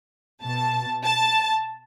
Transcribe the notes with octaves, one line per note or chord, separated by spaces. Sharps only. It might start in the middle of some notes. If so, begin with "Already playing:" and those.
B2 A5
A5